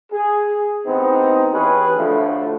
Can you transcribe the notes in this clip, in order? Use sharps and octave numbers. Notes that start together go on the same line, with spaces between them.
G#4
A1 B3 C4 D#4
E3 C#4 G4 G#4 B4
D2 A2 D3 F3 A3